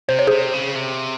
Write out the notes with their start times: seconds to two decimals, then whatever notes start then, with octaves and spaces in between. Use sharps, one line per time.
0.09 C3 C5
0.19 C#5
0.27 C3 G#4 C5
0.53 C#3
0.75 C3